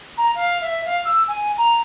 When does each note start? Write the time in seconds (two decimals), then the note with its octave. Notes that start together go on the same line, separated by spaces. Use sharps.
0.17 A#5
0.35 F5
0.61 E5
0.85 F5
1.05 E6
1.28 G#5
1.57 A#5